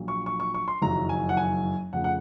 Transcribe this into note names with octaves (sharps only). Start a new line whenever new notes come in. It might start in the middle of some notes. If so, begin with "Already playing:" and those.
Already playing: A#1 A#2 F#3
C#6
C#6
C#6
C#6
C6
F#1 F2 D#3 F#3 A#5
G#5
F#5
G#5
F1 F2 C#3 F3 F#5
F#5